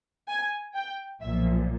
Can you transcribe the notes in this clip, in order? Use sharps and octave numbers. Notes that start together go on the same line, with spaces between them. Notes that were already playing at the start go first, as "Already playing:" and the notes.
G#5
G5
B1 A#2 F3 E5